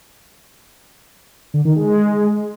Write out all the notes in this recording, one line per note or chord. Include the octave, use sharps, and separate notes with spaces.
D3
D#3
G#3